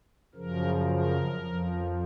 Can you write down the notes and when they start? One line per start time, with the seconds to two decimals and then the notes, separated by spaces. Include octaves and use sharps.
0.35 F#2 C#3 F3 A#4
0.86 A#4
1.37 F2 F3